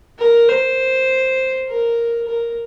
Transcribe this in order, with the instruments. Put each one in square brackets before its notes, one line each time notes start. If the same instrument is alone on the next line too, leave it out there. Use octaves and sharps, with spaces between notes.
[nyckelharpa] A#4
C5
A#4
A#4